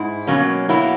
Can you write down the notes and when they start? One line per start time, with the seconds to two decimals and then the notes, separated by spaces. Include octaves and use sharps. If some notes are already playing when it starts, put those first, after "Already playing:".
Already playing: G#2 E4
0.27 B2 F#3 A#3 C#4
0.69 B2 F#3 A#3 E4